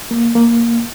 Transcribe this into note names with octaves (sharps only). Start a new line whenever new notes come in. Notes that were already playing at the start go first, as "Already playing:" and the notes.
A#3
A#3